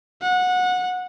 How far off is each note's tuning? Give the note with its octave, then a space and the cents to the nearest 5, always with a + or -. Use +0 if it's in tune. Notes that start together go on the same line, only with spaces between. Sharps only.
F#5 -20